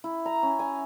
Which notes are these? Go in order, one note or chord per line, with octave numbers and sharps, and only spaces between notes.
E4
A#5
C#4
G#5